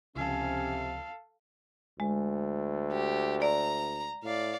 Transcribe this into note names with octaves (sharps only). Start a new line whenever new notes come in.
C#2 C3 F3 C#4 A4 F5
D2 G#3
G4
D5 A#5
A2 D5 F5